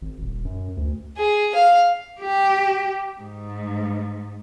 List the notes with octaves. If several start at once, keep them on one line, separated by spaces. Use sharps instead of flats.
G#1
D#1
F#2
D2
G#4
F5
G4
G#2